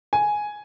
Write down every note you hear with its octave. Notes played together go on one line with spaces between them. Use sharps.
G#5